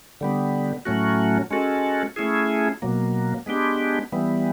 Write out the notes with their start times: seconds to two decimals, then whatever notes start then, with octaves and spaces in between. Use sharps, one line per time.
0.21 D3 G3 B3
0.85 A2 F#3 A3 C#4 F#4
1.51 G#3 C#4 F#4 A4
2.16 A3 C#4 E4 G#4
2.82 B2 F#3 A#3
3.46 G#3 B3 D4 G4
4.12 E3 G3 B3